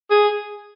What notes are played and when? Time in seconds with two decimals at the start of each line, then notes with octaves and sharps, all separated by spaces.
0.10 G#4